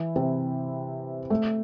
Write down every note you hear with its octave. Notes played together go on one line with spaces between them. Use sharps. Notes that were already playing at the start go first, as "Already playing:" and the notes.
Already playing: E3 E4
C3 C4
A3